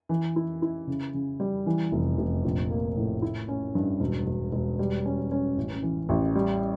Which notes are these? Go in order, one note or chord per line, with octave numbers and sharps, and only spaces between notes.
E3
E4
E4
C#3
C#3
G3
E3
F1
F1
A#1
A#3
A2
E4
C#4
G2
E1
E1
E1
G3
C#4
C#4
A1
E3
A1
G3